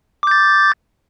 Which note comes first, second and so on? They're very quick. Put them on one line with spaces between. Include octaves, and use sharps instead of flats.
D6 G6 A6